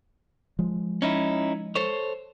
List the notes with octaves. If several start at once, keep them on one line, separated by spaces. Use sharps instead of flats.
F3 G#3
C#4 D#4 E4
A4 C5 C#5